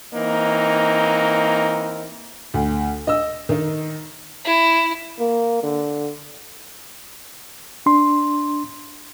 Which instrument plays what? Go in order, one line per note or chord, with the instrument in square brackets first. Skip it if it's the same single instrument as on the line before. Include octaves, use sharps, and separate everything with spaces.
[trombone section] E3 A#3 C4 D#4
[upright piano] D2
D#5 E6
D#3 D#4
[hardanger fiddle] E4
[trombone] A#3
D3
[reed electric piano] D4 C6